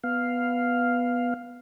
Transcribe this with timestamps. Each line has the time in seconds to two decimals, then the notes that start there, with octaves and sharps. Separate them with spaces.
0.04 B3 F5